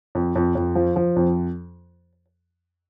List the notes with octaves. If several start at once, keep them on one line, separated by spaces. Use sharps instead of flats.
F2
F2
F2
F3
F3
F2